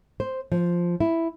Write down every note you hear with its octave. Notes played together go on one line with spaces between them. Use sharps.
C5
F3
E4